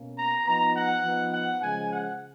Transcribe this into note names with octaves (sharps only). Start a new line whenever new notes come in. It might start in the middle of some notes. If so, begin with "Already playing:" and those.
Already playing: B2 A#3 C#4
A#5
F3 B3 D#4 A#5
F#5
F3 B3 D#4
F#5
C#3 F3 G#3 G#5
F#5